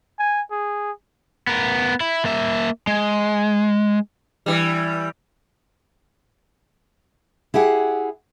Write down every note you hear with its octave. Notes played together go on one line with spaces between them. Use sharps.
G#5
G#4
B3 A#4
E4
A#3 E5
G#3
E3 G3
E4 G4 G#4 F#5